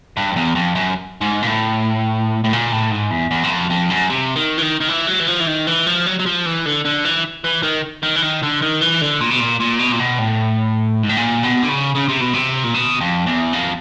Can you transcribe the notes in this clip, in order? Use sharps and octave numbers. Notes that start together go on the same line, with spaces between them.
G2
F2
E2
F2
F#2
G#2
A#2
A2
A2
A#2
A2
G#2
E2
E2
F#2
F2
F2
F#2
C3
D#3
E3
D#3
D#3
E3
F#3
E3
F3
E3
D#3
E3
F3
F#3
F#3
F3
E3
D3
D3
E3
E3
D#3
D#3
E3
D#3
D3
D#3
E3
D3
A#2
B2
A#2
A#2
B2
A#2
B2
A2
G#2
A2
A#2
B2
D3
C#3
C#3
C3
B2
C3
A#2
B2
F2
E2
F2